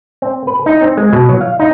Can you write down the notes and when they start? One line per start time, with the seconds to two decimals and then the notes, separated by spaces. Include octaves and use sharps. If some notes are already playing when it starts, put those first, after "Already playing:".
0.22 C4
0.47 B4
0.66 D#4
0.82 C4
0.97 G#3
1.13 B2
1.29 F#3
1.41 F5
1.59 D#4